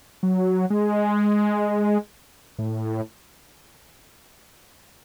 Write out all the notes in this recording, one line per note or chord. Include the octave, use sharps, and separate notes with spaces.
F#3
G#3
A2